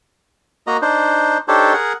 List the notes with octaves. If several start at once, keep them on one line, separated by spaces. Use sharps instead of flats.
A#3 F#4 D#5 A#5
D4 D#4 C5
D4 D#4 G4 A4 C5 C#5
G#4 A#4 F#5